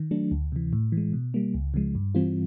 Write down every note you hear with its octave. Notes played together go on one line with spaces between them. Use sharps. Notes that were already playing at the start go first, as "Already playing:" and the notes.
Already playing: D#3
F#3 A3 D4
D2
C3 E3
A2
E3
G#3
B2
G3 A#3
C#2
C#3 F3 G#3
G2
E3 G3 C4 F4